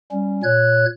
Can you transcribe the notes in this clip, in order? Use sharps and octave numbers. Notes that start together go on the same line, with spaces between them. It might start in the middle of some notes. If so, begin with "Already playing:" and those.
G3 C#4
A#2 C#5 F#6 G#6